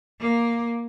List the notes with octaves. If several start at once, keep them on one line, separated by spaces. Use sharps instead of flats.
A#3